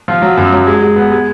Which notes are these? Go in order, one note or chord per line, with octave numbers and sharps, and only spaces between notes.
F3
F#3
F#2
F#3
G#3
G#3
B3
G#3